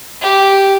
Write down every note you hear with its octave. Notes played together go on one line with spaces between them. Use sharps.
G4